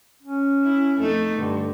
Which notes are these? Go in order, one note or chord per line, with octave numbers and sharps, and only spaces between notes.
C#4
E4
F2 A3 D#4
G2 D3